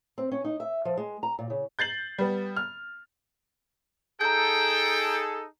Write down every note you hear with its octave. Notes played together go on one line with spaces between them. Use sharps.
C4
C#4
D#4
E5
F3
G#3
A#5
A#2
C#3
G6 A6 C7 F#7
G3 B3
F6
D#4 G#4 A4 G5 A#5 G6